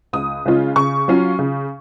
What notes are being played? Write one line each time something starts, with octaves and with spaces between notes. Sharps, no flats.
C#2 D#6
C#3 G#3 C#4 F4
C#3 C#6
F#3 C#4 F4
C#3